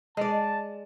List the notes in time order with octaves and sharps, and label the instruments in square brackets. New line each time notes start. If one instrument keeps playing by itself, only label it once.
[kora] G#3 D5 [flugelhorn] A5